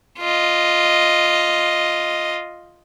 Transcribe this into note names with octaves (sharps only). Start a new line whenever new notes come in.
F4 D#5